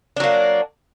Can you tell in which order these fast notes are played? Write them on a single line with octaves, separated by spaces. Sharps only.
D4 F#3 A#3